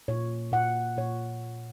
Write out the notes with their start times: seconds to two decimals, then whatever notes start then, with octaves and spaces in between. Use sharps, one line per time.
0.08 A#2 C#5
0.52 A#2 F#5
0.97 A#2 C#5